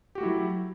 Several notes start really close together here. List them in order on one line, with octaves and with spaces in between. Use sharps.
G4 F#4 A3 E4 F#3